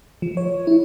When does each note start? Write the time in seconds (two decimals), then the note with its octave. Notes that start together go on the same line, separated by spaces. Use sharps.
0.22 F3
0.37 C#5
0.67 E4